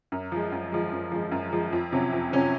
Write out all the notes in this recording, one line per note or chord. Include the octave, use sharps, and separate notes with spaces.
F#2
F3 G#3
F#2
F3 G#3
F#2
F3 G#3
F#2
F3 G#3
F2
C3 F#3 C#4
F2
C3 F#3 C#4